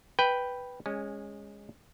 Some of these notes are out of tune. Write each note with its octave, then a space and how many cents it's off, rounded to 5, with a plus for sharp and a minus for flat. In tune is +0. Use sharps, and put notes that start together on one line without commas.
B4 +0 G5 +0
G#3 -15 C#4 +0